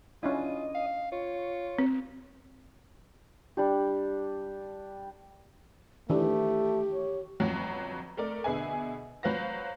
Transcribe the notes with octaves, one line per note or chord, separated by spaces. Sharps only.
C#4 D4 E4 F4 D#5
F5
F4 C#5
C4
G3 D4 G4
D#3 E3 A3 D4 G4
C#5
G1 F2 F#3
A3 A#4 D5
B2 D3 G#4 B4 E5 G#5
F#3 B4 C5 F5 A#6